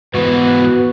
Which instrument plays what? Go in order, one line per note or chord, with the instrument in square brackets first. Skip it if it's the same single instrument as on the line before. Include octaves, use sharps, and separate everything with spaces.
[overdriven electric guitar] G#2 E3 [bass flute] B3 [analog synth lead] F#4 [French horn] B4